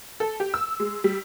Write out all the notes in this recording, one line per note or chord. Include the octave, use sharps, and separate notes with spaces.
A4
G4
E6
G#3
G3